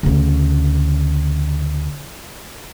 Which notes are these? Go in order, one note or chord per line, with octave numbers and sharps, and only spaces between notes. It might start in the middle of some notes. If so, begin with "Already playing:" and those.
D2 C#3